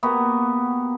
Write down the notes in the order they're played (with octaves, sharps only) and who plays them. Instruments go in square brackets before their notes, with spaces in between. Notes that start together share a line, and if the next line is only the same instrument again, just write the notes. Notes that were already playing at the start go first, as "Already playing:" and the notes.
[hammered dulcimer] A#3 B3 F#4 G4